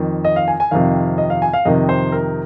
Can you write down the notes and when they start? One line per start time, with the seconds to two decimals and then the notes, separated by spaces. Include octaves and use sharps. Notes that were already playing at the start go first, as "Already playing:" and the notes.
Already playing: F2 D#3
0.25 D#5
0.36 F5
0.48 G#5
0.60 G#5
0.71 F2 C3 D#3 F5
1.18 D#5
1.30 F5
1.42 G#5
1.53 F5
1.65 F2 C3 D#3 D#5
1.89 C5
2.12 A#4